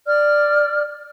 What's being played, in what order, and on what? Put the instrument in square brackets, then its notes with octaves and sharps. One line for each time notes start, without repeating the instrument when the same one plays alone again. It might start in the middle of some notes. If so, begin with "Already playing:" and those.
[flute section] D5 F6